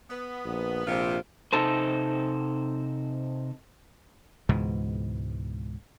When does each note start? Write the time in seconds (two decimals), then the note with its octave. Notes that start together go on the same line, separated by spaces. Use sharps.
0.10 B3
0.45 A#1
0.87 A#1 C3 F4
1.53 C3 D#4 A4 C5
4.49 C#2 G#2 B2 E3